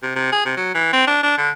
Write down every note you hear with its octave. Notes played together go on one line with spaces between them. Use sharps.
C3
C3
G#4
C3
F#3
E3
C4
D4
D4
D3